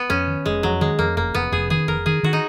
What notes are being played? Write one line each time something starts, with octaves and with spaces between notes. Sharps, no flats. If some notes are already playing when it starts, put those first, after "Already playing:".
Already playing: B3
F2 C#4
D#3
F1 G#3
F2 F#3
D#3 G#3
F2 A#3
F1 A#3
F1 B3
F1 G#4
D#3 G#4
F1 A#4
D#3 G#4
D#3 F#4
D#4